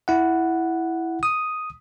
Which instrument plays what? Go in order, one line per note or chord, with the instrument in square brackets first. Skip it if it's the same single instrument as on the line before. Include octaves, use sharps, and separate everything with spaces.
[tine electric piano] E4 F#5
D#6